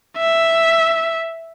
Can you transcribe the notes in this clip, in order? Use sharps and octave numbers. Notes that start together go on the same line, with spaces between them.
E5